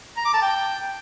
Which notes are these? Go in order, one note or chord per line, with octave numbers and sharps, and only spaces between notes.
A#5
D6
A5
G5